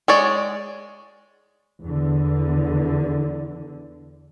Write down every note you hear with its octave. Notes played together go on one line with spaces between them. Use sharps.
G#3 C#5 D5
E2 D3